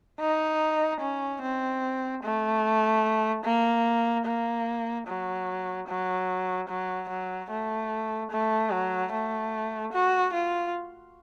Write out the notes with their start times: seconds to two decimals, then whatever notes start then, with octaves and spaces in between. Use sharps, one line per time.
0.20 D#4
1.01 C#4
1.42 C4
2.23 A3
3.44 A#3
4.25 A#3
5.07 F#3
5.88 F#3
6.68 F#3
7.09 F#3
7.50 A3
8.31 A3
8.71 F#3
9.12 A3
9.93 F#4
10.34 F4